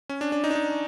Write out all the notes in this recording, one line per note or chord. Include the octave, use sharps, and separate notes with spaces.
C#4
D4
D4
D#4
D4
D#4